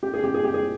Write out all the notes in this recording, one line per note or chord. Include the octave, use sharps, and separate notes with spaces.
G4
G#4
G4
G#4
G4
G#4